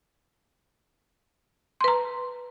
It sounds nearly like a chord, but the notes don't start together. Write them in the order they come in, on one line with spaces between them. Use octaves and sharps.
C6 B4 A#5